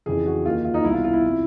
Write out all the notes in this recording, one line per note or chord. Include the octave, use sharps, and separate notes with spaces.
F2 C#3 E3 G#4
F#4
D#2 D#3 F4
F4
D#4
C2 B2 E4
F4
F4
E4
C3 F3